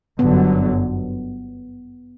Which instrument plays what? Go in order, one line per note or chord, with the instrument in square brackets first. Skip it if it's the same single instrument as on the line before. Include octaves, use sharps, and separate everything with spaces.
[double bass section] G1 F#2 D3 F#3 [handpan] B3